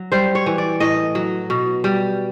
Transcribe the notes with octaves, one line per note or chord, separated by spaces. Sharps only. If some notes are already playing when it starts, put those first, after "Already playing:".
Already playing: F#3
G3 C5
C#5
E3
D5
A2 D#5
F#3
B2
G3